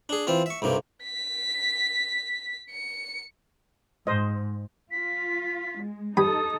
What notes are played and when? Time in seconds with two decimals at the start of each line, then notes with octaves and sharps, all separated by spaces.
0.09 D4 G#4
0.27 E3 C4 F4
0.46 E5 C#6
0.62 B1 G2 C3 A#3
1.04 B6
2.71 C#7
4.07 G#2 C5 D#5
4.91 F4 B6
5.80 G#3
6.17 G2 D#4 A4 B5 D#6